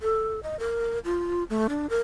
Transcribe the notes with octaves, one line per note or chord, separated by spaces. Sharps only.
A4
D#5
A#4
F4
A3
D4
A#4